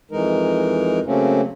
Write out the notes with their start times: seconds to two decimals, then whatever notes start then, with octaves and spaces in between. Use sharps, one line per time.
0.11 F2 E3 G#3 D#4 A#4
1.06 C#3 F#3 A3 A#3 C4 C#4